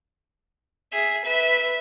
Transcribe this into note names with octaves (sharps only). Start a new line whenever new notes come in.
G#4 E5
B4 E5